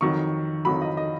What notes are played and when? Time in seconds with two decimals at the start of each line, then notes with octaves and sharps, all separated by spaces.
0.01 F2 D#3 F#3 C#6
0.65 F2 D#3 F#3 B5
0.82 D#5
0.97 D#5